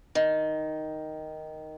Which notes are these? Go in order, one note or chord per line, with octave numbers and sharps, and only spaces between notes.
D#3